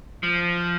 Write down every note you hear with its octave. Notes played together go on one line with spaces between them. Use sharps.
F3